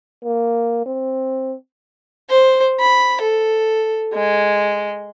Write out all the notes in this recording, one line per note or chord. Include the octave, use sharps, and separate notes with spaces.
A#3
C4
C5
B5
A4
G#3